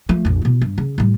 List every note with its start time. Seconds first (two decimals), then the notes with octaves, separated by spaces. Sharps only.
0.09 F3 A3
0.25 A#1 F2
0.42 B2 E4
0.62 G2
0.78 C#3
0.98 A2 G3